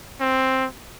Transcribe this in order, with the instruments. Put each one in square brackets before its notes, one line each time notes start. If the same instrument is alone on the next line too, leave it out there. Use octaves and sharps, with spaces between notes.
[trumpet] C4